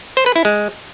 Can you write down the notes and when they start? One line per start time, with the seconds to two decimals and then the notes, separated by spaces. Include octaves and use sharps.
0.17 C5
0.26 B4
0.36 E4
0.45 G#3